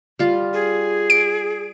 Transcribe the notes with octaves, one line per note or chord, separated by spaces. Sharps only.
G3 F4
G#4
D7